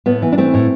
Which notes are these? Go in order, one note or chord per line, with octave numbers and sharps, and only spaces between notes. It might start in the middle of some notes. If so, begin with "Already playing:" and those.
A2 B3
E3
D4
E3 A3 C4
A2